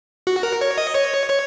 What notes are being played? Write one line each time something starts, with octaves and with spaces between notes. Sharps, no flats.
F#4
A#4
C#5
D#5
C#5
C#5